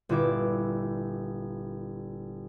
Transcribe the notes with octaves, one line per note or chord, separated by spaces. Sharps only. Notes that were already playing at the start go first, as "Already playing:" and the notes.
G1 A#2 E4 D6